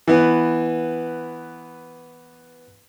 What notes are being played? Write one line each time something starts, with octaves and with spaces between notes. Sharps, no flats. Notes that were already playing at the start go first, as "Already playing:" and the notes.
E3 B3